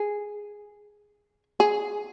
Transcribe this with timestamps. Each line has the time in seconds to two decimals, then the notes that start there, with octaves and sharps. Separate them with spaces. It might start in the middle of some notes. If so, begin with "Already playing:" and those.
Already playing: G#4
1.60 G#4